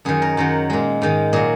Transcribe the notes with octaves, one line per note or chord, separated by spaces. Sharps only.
F#2 D#3 F#3 G#4
A#4
F#2 D#3 F#3 A#4
A#2 G#3
G#2 D#3 G#3
A#2 F#3 G#4